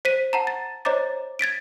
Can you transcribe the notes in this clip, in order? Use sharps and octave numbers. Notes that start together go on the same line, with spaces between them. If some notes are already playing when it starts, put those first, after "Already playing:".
C5 B6 D#7
F#5 A5 A#5
A6
C5 C#5 D#5 A#5 D6 A6
G#6 A6 B6 D7